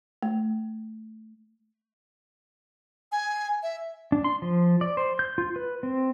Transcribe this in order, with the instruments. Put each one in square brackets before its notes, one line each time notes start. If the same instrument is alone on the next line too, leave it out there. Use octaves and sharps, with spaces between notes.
[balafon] A3
[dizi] G#5
E5
[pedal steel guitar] D4
C6
F3
D5
C5
G6
F4
B4
C4